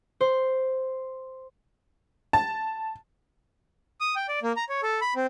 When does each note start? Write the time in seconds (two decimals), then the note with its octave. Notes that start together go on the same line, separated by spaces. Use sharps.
0.21 C5
2.33 A5
4.01 D#6
4.16 G5
4.28 D5
4.43 A#3
4.57 A#5
4.69 C#5
4.83 A4
5.01 B5
5.16 C4